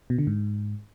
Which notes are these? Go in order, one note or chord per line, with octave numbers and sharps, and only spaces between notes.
B2
D3
G#2